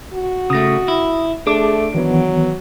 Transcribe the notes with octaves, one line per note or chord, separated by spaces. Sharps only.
F#4
C#3 A3 D#6 A#6
E4
A3 D4 G#4 D6
D#3 E3 F#3 B3